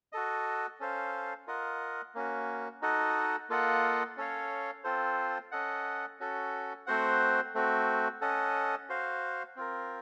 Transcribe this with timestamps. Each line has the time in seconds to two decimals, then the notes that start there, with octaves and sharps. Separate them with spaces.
0.12 F#4 A4 D#5
0.80 C#4 A4 C5 F5
1.47 F4 A#4 D#5 F#5
2.15 A#3 C#4 F#4
2.82 D#4 F#4 A4 D#5 F#5
3.50 A#3 F4 A4 D#5 F#5
4.17 C#4 A4 C#5 F5
4.84 C4 F4 A4 C5
5.52 C#4 A4 D#5 F#5
6.20 C#4 F#4 A4
6.86 A3 C4 F#4 C5 F#5
7.54 A3 C4 F#4
8.21 C#4 A4 D#5 F#5
8.89 F#4 C5 F5
9.56 C4 F4 A#4